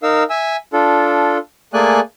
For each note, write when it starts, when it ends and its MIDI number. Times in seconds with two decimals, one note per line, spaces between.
0.03 0.23 63
0.03 0.23 70
0.03 0.23 77
0.03 0.23 88
0.30 0.56 76
0.30 0.56 80
0.30 0.56 88
0.73 1.38 62
0.73 1.38 65
0.73 1.38 69
1.74 2.00 57
1.74 2.00 58
1.74 2.00 68
1.74 2.00 74
1.74 2.00 80
1.74 2.00 90